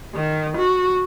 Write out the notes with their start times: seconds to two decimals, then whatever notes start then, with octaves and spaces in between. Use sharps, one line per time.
0.14 D#3
0.57 F#4